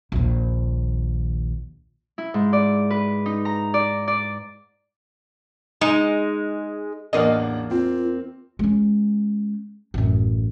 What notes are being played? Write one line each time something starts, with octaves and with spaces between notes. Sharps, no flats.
A#1 D#2
E4
G#2
D5
B4
D#4
A#5
D5
D5
G#3 D#4
A1 E2 A#3 D4 D#5 F#5
C4 F4
G#3 C#4
A1 F#2